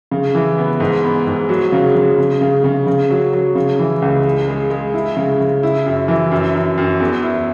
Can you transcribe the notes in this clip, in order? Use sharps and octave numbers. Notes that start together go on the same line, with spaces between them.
C#3
E3
B3
G#2
B3
G#2
F#3
C#3
C#3
C#3
C#3
C#3
C#3
F#3
F#3
C#3
E3
C#2
G#3
G#3
G#3
E4
C#3
C#3
E4
F#2
E3
F#2
F#2
F#2
E2
E4